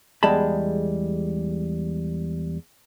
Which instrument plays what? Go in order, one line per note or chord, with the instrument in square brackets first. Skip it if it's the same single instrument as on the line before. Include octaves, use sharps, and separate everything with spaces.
[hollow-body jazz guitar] E2 G3 G#3 A5 B5